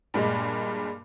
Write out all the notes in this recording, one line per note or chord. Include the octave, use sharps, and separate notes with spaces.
G2 A#2 G#3